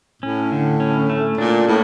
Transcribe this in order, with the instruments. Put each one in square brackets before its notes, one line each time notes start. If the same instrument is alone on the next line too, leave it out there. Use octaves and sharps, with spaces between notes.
[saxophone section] A2 [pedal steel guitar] C#4
[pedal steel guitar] D3
C#4
A3
[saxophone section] A#2 [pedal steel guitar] D4
[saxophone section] A2 [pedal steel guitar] A#3